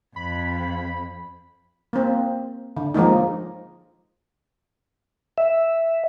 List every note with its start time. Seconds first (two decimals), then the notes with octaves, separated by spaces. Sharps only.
0.16 F2 B5
1.93 A#3 C4
2.77 D3
2.94 F3 G#3 A#3 D#4
5.38 E5